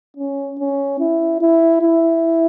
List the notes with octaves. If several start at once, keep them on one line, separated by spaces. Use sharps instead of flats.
C#4
C#4
E4
E4
E4